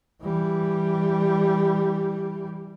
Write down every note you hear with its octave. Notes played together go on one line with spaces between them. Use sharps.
E3 G3